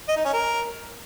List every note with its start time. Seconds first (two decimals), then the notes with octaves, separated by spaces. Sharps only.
0.08 D#5
0.16 D#4
0.25 C#4
0.33 A#4